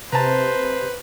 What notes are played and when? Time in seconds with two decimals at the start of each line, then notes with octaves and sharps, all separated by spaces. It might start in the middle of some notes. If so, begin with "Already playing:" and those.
0.12 C3 B4 C5 A5 A#5